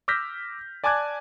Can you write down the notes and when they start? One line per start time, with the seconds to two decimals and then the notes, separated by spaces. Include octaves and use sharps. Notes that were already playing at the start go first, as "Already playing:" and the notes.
0.08 D6 E6 F6 G6 A#6 B6
0.84 D5 G#5 A5 D6 F#6 G#6